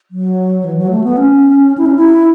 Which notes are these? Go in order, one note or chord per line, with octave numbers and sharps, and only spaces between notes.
F#3
E3
F#3
A3
B3
C#4
E4
C#4
E4